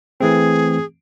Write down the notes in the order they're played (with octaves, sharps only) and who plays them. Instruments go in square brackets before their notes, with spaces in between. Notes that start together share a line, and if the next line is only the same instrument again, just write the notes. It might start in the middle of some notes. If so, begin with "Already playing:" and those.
[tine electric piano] E3 A3 C4 [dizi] G#4